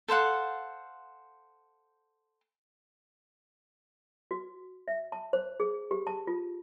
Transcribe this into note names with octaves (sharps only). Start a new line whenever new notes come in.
A4 C5 F5 F#5
F#4
E5
A5
C5
G#4
G4
A5
F4